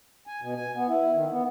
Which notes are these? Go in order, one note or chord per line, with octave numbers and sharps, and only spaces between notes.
G#5
B2
G#5
B3
E4
D#3
B3